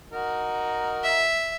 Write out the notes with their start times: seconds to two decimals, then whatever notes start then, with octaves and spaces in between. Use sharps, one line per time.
0.12 D#4 F#4 A#4
1.03 E5